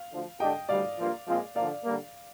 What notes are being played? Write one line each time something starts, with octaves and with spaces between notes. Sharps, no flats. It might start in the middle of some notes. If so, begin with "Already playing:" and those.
Already playing: F5
D2 D3 F3
D3 G#3 D4 G4 D#5 G5
D2 D3 G3 D5 F5
G2 F3 A#3 F4
A#2 F3 G#3 C4 F4
D3 F3 A#3 D5 F5
D3 G3 A#3